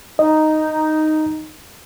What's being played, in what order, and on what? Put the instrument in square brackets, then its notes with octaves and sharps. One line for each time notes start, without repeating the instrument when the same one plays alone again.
[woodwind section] D#4 [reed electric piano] D#5